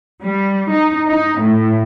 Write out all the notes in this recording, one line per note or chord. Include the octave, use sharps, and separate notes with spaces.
G3
D#4
D#4
A2